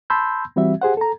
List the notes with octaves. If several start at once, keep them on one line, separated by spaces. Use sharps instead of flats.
A5 B5 C6 E6 G6
E3 G3 C4 F#4 E5
G4 G#4 C5 F#5
A4 A#5